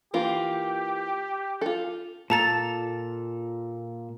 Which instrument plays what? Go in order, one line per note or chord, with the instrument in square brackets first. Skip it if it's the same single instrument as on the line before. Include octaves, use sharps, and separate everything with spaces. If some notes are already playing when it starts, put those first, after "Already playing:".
[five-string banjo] E3 A#3 F4 [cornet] G4
[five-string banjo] F4 A4
[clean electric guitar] A#2 A4 [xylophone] A5 A#5 A6